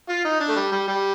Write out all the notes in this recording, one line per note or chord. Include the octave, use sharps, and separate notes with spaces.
F4
D#4
D4
A3
G3
G3
G3